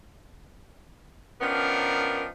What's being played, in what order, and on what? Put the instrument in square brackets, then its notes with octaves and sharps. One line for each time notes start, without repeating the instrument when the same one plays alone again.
[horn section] D#3 F3 B3 C#4 D4 A#4